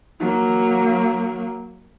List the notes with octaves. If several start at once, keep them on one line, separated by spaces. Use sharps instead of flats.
F#3 A#3